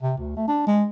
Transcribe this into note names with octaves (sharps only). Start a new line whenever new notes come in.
C3
D2
A3
D4
G#3